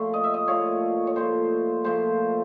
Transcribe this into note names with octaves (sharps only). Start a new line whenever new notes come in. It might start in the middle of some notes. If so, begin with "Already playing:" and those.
Already playing: A#2 F3 A3
D#5
E5
D#5
A#2 F3 A3 C#5
C#5
A#2 F3 A3 C5
A#2 F3 A3 C5